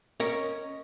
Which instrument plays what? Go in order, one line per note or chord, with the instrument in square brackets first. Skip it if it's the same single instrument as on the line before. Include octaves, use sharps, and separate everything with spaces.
[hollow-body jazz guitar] C#4 A#4 C#5 D#5